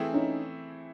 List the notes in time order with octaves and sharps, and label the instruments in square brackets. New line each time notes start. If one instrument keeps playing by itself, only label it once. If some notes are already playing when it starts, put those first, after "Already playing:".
Already playing: [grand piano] E3 A3 C4 E4 G#4
[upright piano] C#4 D#4